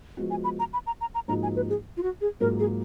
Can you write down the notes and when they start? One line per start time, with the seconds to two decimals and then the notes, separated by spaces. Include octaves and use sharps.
0.17 F3 G#3 B3 F#4
0.30 G#5
0.44 B5
0.59 A#5
0.73 B5
0.86 A#5
1.01 A#5
1.14 A#5
1.28 G#2 F3 A#3 D#4 F#4 A#5
1.43 G#5
1.56 B4
1.70 G#4
1.97 F4
2.03 F#4
2.21 G#4
2.40 G#2 F#3 A#3 F4 A#4
2.59 G#4